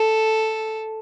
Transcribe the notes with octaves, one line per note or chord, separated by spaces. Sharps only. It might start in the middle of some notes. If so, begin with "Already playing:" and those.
Already playing: A4